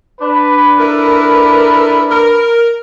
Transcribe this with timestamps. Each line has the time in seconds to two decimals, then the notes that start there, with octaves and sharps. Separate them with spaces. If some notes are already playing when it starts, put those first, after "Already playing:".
0.21 D4 B4
0.79 E4 A4 A#4
2.10 A#4